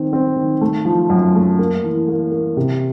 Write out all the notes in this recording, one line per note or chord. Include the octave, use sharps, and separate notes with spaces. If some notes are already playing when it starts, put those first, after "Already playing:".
Already playing: D#3 C4
C4
D#3
A3
F3
F#2
A3
A#3
E3
A#3
A#3
C3